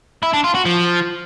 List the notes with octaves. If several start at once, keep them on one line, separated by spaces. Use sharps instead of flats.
E4
D4
F4
F#4
F3